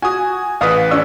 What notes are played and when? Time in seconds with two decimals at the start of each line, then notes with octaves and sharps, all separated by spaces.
0.02 F#4 G#5 D#6
0.61 A1 B4 F5 D#6
0.91 C#4 D4 E6